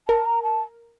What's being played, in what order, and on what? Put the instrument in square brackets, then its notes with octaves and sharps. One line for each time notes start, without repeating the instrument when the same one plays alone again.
[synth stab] A#4 [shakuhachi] A5
[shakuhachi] A#5
A5